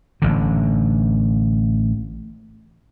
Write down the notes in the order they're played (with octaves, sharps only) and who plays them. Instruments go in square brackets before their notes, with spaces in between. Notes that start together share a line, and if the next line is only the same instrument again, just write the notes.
[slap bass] A1 D3